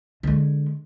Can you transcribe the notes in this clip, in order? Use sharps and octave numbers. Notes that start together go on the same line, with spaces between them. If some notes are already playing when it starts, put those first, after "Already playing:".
D3 G#3